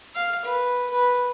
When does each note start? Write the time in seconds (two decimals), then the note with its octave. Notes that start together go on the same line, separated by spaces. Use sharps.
0.15 F5
0.45 B4
0.90 B4